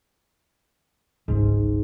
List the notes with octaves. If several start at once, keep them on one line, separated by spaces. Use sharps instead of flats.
G1 C#2 G#2